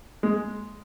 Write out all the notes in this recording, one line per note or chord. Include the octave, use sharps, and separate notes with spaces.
G#3